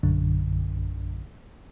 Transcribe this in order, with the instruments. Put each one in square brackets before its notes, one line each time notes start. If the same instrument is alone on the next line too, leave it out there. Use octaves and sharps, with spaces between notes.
[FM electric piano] A#1 F#2 D3